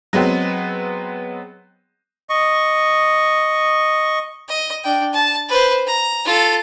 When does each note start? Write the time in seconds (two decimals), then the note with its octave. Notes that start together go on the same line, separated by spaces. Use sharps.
0.13 F#3 G#3 B3 C4
2.30 D#5 C#6
4.48 D#5
4.84 D4 G5
5.13 A5
5.49 B4 C5
5.87 A#5
6.25 F4 A4